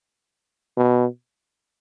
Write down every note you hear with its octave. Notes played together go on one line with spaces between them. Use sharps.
B2